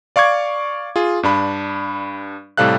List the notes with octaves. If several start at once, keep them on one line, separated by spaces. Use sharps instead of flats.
D5 F5 C#6 D6 G#6
F4 G#4
G2 D4 B5
A2 C3 G3 A4 F5 F#6